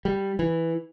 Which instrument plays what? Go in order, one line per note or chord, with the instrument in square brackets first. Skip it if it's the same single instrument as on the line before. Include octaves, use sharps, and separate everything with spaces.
[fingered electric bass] G3
E3